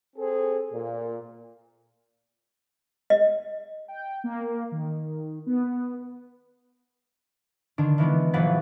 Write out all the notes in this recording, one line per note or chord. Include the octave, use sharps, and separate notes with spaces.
C4 G#4 A4 C5
A#2
D#5
G5
A#3
D#3
B3
D3 D#3 D4
D#3 E3 G#3 B3
A#1 E3 F#3 B4 F#5 A6